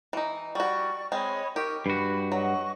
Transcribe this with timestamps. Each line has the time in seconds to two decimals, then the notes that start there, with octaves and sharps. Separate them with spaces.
0.13 E3 D#4
0.55 G3 F#4 D5 C#6
1.12 G#3 C4 C#5 D#5 B5
1.56 D#4 G4 A#4 C#6
1.86 G2 F#4 B4 B5
2.32 F#3 D#5 F#5 C#6